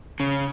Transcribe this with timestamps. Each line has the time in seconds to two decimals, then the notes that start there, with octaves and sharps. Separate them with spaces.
0.20 C#3